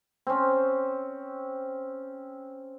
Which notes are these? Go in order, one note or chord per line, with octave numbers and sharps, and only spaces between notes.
C4 C#4